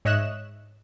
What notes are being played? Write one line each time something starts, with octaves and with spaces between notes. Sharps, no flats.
G#2 C#5 D#5 E5 F#6 E7